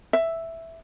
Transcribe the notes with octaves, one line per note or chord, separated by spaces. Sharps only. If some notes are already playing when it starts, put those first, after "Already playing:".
E5